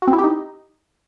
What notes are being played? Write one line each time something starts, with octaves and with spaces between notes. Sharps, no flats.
F#4
C4
E4
G4
D#4